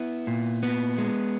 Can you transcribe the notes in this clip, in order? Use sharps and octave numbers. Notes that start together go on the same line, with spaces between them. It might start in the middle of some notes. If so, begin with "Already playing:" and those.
Already playing: B3 E4
A#2
B3
G#3